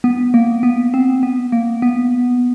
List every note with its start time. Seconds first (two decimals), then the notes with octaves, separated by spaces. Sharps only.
0.04 B3
0.34 A#3
0.63 B3
0.94 C4
1.23 B3
1.52 A#3
1.82 B3